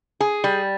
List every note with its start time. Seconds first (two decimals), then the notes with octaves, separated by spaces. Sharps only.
0.20 G#4
0.44 G3